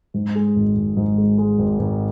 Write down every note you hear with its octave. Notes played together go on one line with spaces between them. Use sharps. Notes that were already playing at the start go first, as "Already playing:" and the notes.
G#2
G#3
G#1
G#1
G#2
G#3
G#3
G#1
G#1